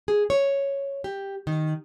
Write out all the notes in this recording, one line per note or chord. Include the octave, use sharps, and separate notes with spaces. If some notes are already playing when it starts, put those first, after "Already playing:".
G#4
C#5
G4
D#3